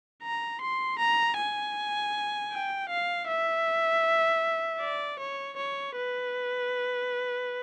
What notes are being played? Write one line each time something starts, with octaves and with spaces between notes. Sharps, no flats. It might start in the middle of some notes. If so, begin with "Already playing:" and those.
A#5
C6
A#5
G#5
G5
F5
E5
D5
C#5
C#5
B4